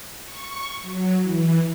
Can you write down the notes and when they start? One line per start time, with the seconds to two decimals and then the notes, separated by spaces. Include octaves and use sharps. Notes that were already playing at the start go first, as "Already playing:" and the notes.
0.23 C#6
0.81 F#3
1.21 E3